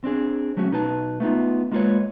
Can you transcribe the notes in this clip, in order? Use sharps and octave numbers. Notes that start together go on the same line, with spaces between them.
C4 D4 G#4
F#3 A3 C#4 F#4
B1 D#4 B4 A5
A3 B3 D#4 F4
G#3 A#3 F4 F#4 B4 C#5